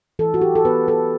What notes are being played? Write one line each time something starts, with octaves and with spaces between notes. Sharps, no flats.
E3 A4
F#4
G4
A4
B3 B4
A4